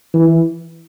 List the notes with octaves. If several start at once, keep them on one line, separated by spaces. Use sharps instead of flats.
E3